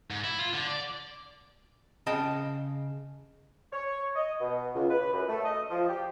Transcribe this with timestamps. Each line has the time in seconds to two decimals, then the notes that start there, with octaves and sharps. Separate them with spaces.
0.10 G#2
0.24 E4
0.38 F4
0.53 D3
0.67 D5
2.07 C#3 D#5 G5 A5
3.73 C#5
4.16 D#5
4.40 B2
4.75 C#2
4.90 B4
5.13 F#2
5.29 A3
5.44 D#5
5.70 F3
5.88 G4